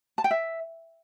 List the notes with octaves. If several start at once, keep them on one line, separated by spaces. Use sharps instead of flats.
A5
G5
E5